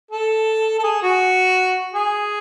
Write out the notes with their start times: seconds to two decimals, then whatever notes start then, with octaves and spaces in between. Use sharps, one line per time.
0.11 A4
0.79 A4
0.83 G#4
1.02 F#4
1.94 G#4